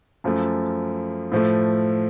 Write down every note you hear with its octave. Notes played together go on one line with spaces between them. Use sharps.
F#2 F3 A3
A2 F3 A3